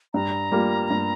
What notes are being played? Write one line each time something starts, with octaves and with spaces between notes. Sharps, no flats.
G2 A#5
G3 A#3 F4
G2